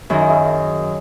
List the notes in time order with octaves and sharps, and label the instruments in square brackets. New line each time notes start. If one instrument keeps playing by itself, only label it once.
[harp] F#2 D#3 F#3 [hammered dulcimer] E4 G#4
[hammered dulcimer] E4 G#4